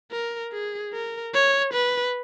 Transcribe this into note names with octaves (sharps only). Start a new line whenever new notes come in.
A#4
G#4
A#4
C#5
B4